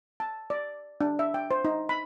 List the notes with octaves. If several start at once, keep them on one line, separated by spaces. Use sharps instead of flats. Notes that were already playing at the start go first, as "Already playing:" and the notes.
A5
D5
D4
E5
G5
C5
D#4
B5